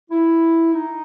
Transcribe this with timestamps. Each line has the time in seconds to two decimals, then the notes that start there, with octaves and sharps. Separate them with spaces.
0.10 E4
0.73 D#4